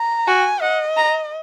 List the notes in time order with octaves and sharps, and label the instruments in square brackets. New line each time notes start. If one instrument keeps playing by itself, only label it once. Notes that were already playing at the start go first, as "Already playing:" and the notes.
Already playing: [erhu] A#5
[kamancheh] F#4 [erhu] G#5
[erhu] D#5 [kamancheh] F#5
[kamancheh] A#5